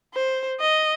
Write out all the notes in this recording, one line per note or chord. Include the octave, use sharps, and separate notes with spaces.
C5
D#5